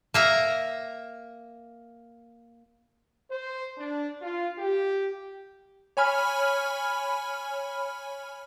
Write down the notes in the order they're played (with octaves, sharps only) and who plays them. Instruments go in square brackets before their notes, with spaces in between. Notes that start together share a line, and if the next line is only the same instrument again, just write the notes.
[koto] A#3 E5 A#5
[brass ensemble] C5
D4
F4
G4
[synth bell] C#5 G#5 B5 F6